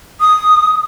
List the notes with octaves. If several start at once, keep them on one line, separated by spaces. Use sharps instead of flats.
D#6